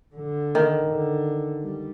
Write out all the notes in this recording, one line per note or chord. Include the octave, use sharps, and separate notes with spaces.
D3
D#3
D3
G3